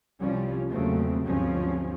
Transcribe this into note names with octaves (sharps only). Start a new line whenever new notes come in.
C2 F3 G3 C#4
E2 A#2 C#3 F#3 A3 C4
D2 G2 F3 G#3 C4 C#4